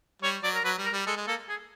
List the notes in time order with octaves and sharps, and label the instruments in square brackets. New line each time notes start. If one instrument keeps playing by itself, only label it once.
[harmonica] G3 [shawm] C#5
[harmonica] F#3 [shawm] D5
[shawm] A#4
[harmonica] F#3 [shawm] B4
[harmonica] G3
[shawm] A#4
[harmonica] G3
[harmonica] G#3 [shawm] A4
[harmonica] G#3
[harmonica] A#3 [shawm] A4
[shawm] G#4